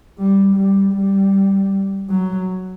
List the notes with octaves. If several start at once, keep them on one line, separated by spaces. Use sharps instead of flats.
G3
G3
G3
F#3